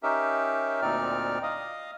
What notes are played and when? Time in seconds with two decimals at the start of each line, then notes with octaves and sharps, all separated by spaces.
0.03 C#4 D#4 G4 A#4 E5
0.82 D2 A#2 C4 D#4 D5 F6
1.43 D#5 F5 D#6